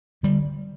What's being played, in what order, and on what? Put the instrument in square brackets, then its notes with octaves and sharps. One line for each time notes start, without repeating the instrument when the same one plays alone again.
[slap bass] D3 G3